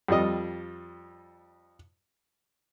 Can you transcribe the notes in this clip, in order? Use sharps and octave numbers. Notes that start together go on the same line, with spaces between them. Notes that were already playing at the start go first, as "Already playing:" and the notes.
F2 G3 D#5